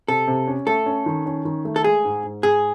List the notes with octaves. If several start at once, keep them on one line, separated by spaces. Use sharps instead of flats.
C3 A4
C3
C#4
A3 A4
C#4
D#3
C#4
D#3
A3
A4
G#3 G#4
G#2
G#2
G#2 G#4